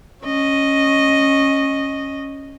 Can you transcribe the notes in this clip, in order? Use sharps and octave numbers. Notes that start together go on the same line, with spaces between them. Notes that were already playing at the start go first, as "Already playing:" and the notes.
C#4 D#5